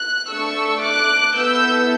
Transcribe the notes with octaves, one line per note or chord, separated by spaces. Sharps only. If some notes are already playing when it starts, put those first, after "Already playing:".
Already playing: F#6
A3 D4 A4 C#6 E6
D6 F#6
B3 E4 A4 E6 G6